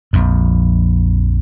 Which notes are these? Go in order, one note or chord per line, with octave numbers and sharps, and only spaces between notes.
A#1 F2